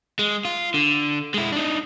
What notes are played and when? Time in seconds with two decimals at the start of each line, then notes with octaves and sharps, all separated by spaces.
0.19 G#3
0.45 F4
0.74 D3
1.34 G#3 E4
1.52 D4 D#4